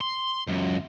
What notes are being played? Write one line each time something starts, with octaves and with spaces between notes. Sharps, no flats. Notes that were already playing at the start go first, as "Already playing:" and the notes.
C6
C#2 F#2